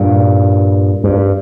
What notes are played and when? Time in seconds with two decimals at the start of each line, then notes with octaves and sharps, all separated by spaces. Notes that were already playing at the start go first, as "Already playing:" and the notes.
Already playing: G2 A#2
1.04 G2